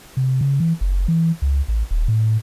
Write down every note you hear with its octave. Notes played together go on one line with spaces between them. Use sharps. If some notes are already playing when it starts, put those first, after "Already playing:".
C3
C#3
E3
F#1
E3
C#2
A1
D#1
A2